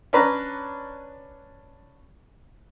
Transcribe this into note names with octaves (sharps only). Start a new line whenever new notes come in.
C#4 D4 B4 A#5